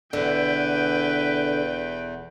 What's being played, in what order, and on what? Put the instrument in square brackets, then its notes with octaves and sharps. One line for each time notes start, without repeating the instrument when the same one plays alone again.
[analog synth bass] E1 [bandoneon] E2 [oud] D3 [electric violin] B4 G5